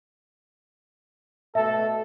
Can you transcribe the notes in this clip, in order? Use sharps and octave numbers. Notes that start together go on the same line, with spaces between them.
B2 A3 A4 E5